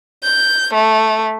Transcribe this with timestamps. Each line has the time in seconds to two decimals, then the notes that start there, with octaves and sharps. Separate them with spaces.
0.23 G6
0.73 A3